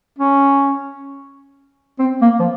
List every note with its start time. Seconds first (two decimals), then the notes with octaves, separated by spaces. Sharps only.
0.19 C#4
1.99 C4
2.22 A#3
2.40 F3